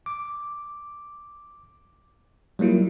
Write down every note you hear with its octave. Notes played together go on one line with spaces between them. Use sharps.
D6
F#3 G3 A#3 E4 F4